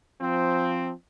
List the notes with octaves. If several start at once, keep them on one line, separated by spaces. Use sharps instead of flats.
F3 C4